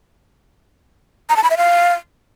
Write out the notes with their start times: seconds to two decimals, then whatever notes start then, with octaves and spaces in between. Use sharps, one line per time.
1.29 A#5
1.36 A5
1.43 B5
1.50 E5
1.57 F5